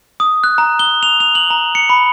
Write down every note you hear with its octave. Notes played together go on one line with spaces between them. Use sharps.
D#6
F#6
A#5
G7
F7
F7
F#7
A#5
C#7
B5